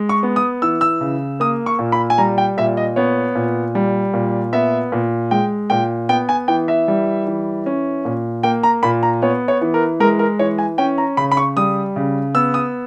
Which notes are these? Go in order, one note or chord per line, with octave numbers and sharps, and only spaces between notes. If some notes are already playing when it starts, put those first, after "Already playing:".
Already playing: G#3
C#6
B3
D#6
E3 E6
E6
C#3
A#3 D#6
C#6
A#2
B5
G#5
G3 A#5
G5
A#2 E5
D#5
B3 C#5
A#2
G3
A#2
B3 E5
A#2
G#3 G5
A#2 G5
B3 G5
G#5
E3 G5
E5
G3
E3
C#4
A#2
A#3 G5
A#5
A#2 B5
A#5
B3 C#5
C#5
E3
A#4
G#3 A#4
A#4
E3 C#5
G#5
C#4 G5
A#5
C#3 B5
B5
C#6
G3 D#6
C#3
B3 E6
D#6